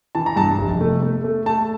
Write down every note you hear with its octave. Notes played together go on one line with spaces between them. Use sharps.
E3 A5
A#5
G2 A5
F1
A3
A3
A3
A3 A5